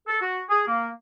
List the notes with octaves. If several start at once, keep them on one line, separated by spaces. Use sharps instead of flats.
A4
F#4
G#4
A#3